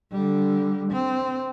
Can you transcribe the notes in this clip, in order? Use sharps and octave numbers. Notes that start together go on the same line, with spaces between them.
D3 G3
C4